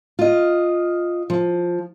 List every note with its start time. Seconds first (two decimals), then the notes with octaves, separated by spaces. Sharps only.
0.19 F4 D#5
1.30 F3